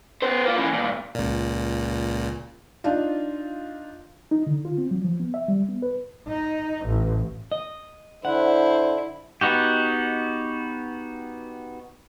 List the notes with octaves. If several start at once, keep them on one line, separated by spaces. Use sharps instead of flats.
B3 C5
A#3 F4
E3 C#4
G2 A#2
C#2 A#2
D4 D#4 F4
D#4
D3
F4
C4
F#3
F3
B3
E5
G3
B3
B4
D#4
A1
D#5
D3 E4 C5 F#5
B3 D#4 F#4 G4